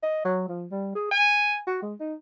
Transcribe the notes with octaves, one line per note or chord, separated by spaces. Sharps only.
D#5
F#3
F3
G3
G#4
G#5
F#4
G#3
D#4